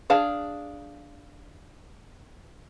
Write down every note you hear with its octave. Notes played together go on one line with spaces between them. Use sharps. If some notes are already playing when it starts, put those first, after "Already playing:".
D4 G#4 F5 A5